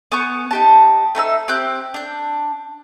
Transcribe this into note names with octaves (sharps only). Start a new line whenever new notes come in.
B3 G#5 C#6 G6
D#4 G4 A5
A3 D#4 G#5 E6
C4 G4 F#6 G6
D4 G6